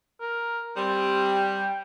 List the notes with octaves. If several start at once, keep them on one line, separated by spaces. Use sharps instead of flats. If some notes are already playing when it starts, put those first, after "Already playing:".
A#4
G3 C4
G5